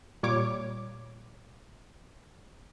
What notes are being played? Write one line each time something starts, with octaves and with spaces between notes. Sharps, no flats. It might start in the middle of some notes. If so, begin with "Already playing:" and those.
A#2 G3 C#5 D6